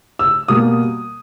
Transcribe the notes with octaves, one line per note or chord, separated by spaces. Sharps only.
E6
B2 G3 A#3 D#6